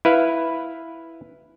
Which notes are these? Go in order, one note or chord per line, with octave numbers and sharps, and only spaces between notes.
E4 B4 F5